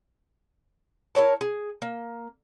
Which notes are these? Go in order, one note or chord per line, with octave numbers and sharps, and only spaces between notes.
E4 A#4 C#5 A5
G#4
A#3